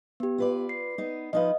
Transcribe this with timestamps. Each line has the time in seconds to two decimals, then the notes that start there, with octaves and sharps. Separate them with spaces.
0.20 B3 G4
0.38 F4 B4 D5
0.69 C7
0.98 B3 D#4
1.33 F3 D#4 B4 D#5 F5